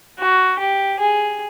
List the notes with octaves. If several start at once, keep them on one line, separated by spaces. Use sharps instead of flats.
F#4
G4
G#4